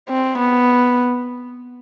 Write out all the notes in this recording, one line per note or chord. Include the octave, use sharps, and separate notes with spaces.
C4
B3